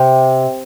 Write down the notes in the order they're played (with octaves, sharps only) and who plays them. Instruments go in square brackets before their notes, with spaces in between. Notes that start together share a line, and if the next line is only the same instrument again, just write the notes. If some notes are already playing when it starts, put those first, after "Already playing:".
Already playing: [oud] C3